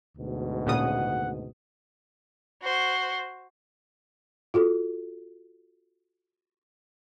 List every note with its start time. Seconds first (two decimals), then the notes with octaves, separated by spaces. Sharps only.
0.18 D2 G#2 B2
0.67 A#2 C#3 F#5 D#6
2.61 F#4 C5
4.54 F4 F#4 A4